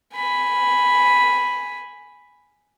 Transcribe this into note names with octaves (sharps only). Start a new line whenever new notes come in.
G#5 B5